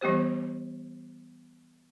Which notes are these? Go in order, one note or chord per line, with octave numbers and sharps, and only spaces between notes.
E3 G3 B3 G4 C5